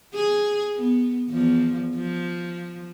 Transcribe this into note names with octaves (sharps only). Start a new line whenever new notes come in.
G#4
B3
E2 F3
F3